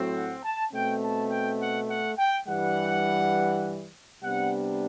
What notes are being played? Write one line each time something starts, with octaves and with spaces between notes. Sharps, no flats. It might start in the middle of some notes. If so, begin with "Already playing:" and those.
Already playing: A2 F#3 A3 C4
F#5
A5
B2 A3 C4 G5
A5
G5
F#5
F#5
G5
G2 E3 G3 F#5
C3 G3 B3 D4 F#5